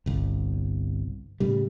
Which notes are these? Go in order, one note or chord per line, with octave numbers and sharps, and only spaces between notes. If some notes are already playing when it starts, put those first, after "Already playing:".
G1 C2
A2 C#3 G3